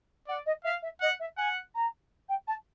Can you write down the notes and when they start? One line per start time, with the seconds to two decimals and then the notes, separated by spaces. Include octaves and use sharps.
0.28 D5 F#5
0.46 D#5
0.64 E5 F5
0.82 E5
1.01 D#5 F#5
1.19 E5
1.37 F#5 G#5
1.74 A#5
2.28 G5
2.47 A5